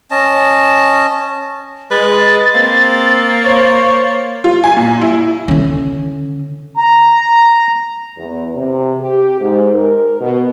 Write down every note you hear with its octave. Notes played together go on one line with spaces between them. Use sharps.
C#4 D#5 A5
G#3 B4 A6
A#3 C4
C5 C#5
F4
G#5
A#2
E4
D3 C#4
A#5
E2
C3
G4
G#2
A#4
B2